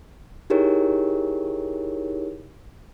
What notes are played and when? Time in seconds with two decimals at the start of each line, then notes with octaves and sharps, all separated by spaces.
0.50 D#4 E4 G4 G#4 A#4 C#5